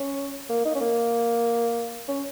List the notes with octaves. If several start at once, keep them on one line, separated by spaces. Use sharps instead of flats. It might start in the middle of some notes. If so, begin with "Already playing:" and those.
Already playing: C#4
A#3
D#4
C#4
A#3
C#4